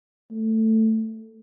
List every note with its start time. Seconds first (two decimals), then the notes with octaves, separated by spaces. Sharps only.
0.31 A3